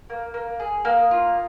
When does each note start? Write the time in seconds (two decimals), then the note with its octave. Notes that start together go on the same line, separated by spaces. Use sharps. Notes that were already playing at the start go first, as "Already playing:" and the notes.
0.10 A#3
0.34 A#3
0.60 G#4
0.85 A#3 D#6
1.11 F4